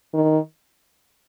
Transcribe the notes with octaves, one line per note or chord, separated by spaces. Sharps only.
D#3